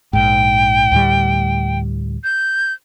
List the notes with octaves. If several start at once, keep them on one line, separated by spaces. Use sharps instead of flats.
A#1 G#2 G5
D2 A2 G3
G6